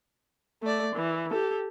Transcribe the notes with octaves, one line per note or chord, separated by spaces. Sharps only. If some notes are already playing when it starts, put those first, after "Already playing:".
A3 D5
E3
G4 A4